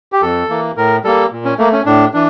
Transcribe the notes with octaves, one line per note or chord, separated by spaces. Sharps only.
G4
F2 A4
E3 A#3
A2 A#4
G3 A#3 A4
A#2
C#4
A3 A#3
C#4
A2 D4
E3 D4